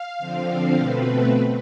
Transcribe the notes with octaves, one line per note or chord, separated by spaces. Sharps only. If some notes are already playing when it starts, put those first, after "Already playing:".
Already playing: F5
D3 F3 C4
B2 A3 C4 B4